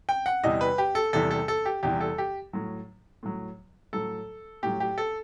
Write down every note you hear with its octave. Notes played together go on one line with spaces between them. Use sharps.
G5
F#5
E2 C3 E3 G3 D#5
B4
G4
A4
E2 C3 E3 G3 A4
A4
A4
G4
E2 C3 E3 G3 G4
A4
G4
A2 F#3
A2 F#3
A2 F#3 A4
A2 F#3 G4
G4
A4